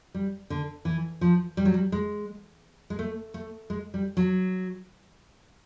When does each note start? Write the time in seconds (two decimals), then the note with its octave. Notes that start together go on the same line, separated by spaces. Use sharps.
0.15 G3
0.50 D3
0.85 E3
1.21 F3
1.57 G3
1.65 F#3
1.74 G3
1.92 G#3
2.90 G#3
2.99 A3
3.34 A3
3.70 G#3
3.94 G3
4.17 F#3